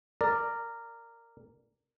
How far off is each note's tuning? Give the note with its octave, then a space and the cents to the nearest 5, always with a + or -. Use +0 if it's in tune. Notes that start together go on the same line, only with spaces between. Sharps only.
A#4 -10 D5 +5